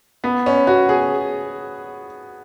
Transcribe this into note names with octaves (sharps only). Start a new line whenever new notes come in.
B3
C#4
F#4
G#4